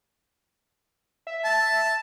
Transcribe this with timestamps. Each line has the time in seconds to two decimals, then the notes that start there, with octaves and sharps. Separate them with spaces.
1.27 E5
1.45 A5